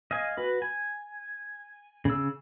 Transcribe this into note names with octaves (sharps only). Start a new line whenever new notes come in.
D#5 F5 G#5
F#4 B4
G#5
C#3 E6